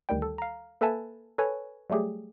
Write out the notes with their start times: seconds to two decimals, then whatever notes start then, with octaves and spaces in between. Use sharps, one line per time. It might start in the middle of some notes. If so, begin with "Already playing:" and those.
0.09 D2 D#3 G3 G5
0.22 A4
0.38 F5 A#5
0.81 A#3 A4 B4 E5 G#5 A5
1.38 A4 B4 C#5 G#5
1.90 F#3 G3 A3 G4 G#4